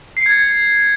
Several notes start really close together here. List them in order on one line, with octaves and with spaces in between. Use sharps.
C7 C#7 G#6 A6